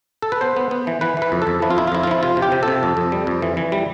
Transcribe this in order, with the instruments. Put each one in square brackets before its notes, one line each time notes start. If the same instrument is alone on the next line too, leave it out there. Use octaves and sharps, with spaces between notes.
[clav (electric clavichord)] A4
B4
B3 C5
B3
B3
E3
E3 B4
E3 B4
F2
A4
F2
F3 E4
F4
F2 E4
F4
F2 E4
F4
F3 E4
C3 F4
C3
G4
C3
A4
C3
F2
F2
G3
F2
E3
E3
G3